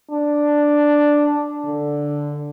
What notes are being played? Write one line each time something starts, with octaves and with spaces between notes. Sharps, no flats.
D4
D3